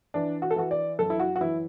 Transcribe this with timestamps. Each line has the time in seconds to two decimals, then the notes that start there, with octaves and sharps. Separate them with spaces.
0.14 E3 D4
0.42 F#4
0.51 A4
0.56 E3 F#4
0.71 D5
0.99 F#2 A4
1.10 E4
1.19 F#4
1.36 F#4
1.41 E3 E4